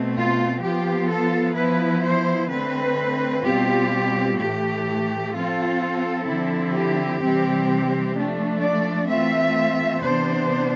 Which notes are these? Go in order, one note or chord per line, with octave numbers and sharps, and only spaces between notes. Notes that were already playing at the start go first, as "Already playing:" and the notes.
Already playing: B2 A3 C4
F4
F3 B3 F4 G4
A4
F3 B3 E4 B4
C5
D3 A3 C4 B4
B2 G3 C4 F4 G4
A2 E3 A3 G4
F3 C4 F4 A4
D3 F3 C4 E4
G4
C3 E3 G3 C4
F3 A3 D4
D5
E3 A3 C4 F4 E5
C3 E3 B3 D4 C5